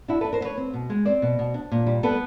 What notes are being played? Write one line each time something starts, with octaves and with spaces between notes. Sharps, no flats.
D4 E4 F#4
D4 A4 B4
A#4 C5
B3
B4 C#5
C4
B2
G#3
C4 C5 D5
B2
B2
D4
A#2
G3
B3 A4 B4